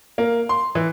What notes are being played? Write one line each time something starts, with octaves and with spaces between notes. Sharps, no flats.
A#3
C6
E3